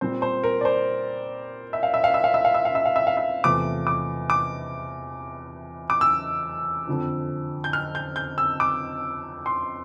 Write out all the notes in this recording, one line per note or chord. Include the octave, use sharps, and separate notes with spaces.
A#2 G3 C4 C5
C5
A#4
D5
C5
E5
F5
E5
F5
E5
F5
E5
F5
E5
F5
E5
F5
E5
F5
E5
E2 C3 F3 A3 D6
D6
D6
D6
E6
F2 D3 F3
G6
F6
G6
G6
E6
D6
C6